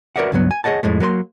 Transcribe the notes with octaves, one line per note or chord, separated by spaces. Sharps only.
F#4 A#4 B4 D5 E5 F#5
C#2 G2 F#3 B3
G#5
G#4 C#5 D#5 F#5 A5
F2 A2 G#3 A3
F#3 A#3 B4 C6